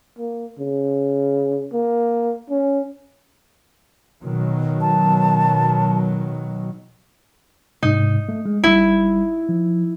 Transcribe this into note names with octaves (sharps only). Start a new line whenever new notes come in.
A#3
C#3
A#3
C#4
B2 D#3 F#3
A5
G#2 C3 D#4
A3
G#3
G1 G3 E4
F3